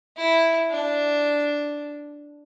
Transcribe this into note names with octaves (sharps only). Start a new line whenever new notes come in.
E4
D4